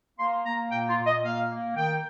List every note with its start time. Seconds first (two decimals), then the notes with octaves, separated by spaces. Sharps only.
0.18 A#3 C6
0.45 A#3 A#5
0.70 A#2 G5
0.89 F4
0.97 A#2
1.06 D#5
1.23 A#3 F5
1.49 A#3
1.76 D#3 G5